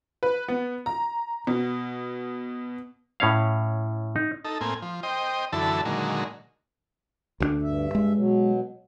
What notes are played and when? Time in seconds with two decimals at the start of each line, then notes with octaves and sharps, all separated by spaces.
0.23 B4
0.48 B3
0.86 A#5
1.47 B2
3.20 A2 C#4 C#5 F5
4.16 D#4
4.45 D#4 A4
4.61 A2 A#3 C4 G#5
4.82 F3
5.03 C5 D#5 G5
5.53 F#2 D3 E3 E4 A4 A5
5.85 A#2 D3 D#3 F#3 G#3
7.40 D2 G3 D4
7.62 G2 E5
7.95 G#3
8.16 B2 F#3